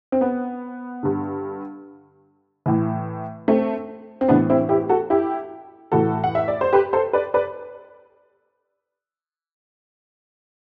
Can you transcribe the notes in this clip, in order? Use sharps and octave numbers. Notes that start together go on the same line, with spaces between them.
C4
B3
G2 D3
A2 E3
A3 C4
C4
A2 E3 B3 D4
C4 E4
E4 G4
F#4 A4
E4 G4
A2 E3 F#4 A4
F#5
E5
D5
C5
G4 B4
A4 C5
B4 D5
B4 D5